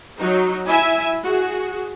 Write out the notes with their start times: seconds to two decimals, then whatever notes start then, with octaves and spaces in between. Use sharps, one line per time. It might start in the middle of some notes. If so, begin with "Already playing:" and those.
0.18 F#3 D#4
0.67 E4 E5 G#5
1.23 F#4 G#4